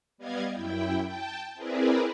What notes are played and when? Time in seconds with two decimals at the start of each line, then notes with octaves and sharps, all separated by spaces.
0.18 G3 B3 D5 D#5 F5 G#6
0.52 F#2 E4 G5
1.06 G5 A5
1.55 C4 E4 G#4 A#4 B4 D5